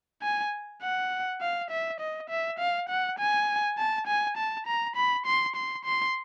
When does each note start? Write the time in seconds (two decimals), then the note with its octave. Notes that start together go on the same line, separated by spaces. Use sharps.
0.23 G#5
0.82 F#5
1.41 F5
1.70 E5
2.00 D#5
2.30 E5
2.59 F5
2.89 F#5
3.19 G#5
3.78 A5
4.07 G#5
4.37 A5
4.67 A#5
4.96 B5
5.26 C6
5.56 C6
5.85 C6